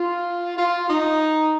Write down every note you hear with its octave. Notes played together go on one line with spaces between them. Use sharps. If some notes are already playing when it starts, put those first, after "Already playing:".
Already playing: F4
F4
D#4